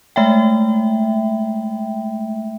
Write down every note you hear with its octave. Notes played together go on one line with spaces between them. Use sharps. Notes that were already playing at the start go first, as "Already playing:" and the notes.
G#3 A3 E5 G5